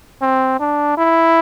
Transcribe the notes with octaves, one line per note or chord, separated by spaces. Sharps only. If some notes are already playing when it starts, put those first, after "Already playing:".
C4
D4
E4